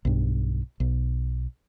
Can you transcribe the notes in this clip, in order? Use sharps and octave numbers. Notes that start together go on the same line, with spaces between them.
B1 G2
B1